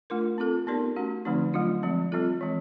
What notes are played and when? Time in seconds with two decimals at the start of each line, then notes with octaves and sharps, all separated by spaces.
0.10 A3 D4 F4 A#4
0.38 C4 F4 A4
0.67 B3 D#4 G4 A#4 D5
0.96 A3 C#4 F#4
1.25 D3 F3 A3 C4 D#4
1.53 F#3 A3 D4 F4
1.83 F3 G#3 C4
2.12 G3 C4 F4 A4
2.41 E3 G#3 C4